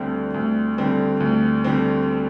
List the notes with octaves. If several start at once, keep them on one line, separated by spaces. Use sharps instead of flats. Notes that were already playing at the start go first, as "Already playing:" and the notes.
Already playing: D2 D3 G3 C4
D2
D3 G3 C4
D2
D3 G3 C4